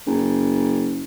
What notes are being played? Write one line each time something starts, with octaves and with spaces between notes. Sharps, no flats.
F#1